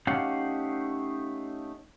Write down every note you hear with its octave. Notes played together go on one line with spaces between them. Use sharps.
A3 C#4 D#4 G4 F5 F#5